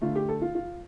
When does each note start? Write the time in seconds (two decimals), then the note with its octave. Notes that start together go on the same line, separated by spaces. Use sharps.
0.02 D3 A3 F4
0.16 G4
0.29 A4
0.42 F4
0.55 F4